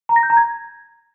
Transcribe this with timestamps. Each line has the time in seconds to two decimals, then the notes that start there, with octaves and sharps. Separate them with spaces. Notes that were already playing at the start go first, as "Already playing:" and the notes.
0.09 A#5
0.16 A#6
0.23 G6
0.30 A#5
0.37 G#6